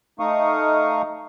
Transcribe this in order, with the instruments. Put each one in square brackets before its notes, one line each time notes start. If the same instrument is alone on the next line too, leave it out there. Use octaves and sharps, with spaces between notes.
[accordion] A3 D#4 F5 C#6 D#6